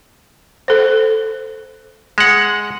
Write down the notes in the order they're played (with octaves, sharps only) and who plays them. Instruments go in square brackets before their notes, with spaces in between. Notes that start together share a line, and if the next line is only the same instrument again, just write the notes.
[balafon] A4 C5
[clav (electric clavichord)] G#3 F#5